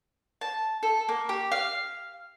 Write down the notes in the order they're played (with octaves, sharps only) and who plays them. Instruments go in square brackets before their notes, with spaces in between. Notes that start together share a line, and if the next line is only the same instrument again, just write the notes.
[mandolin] A5
A4
A#3
G4
F5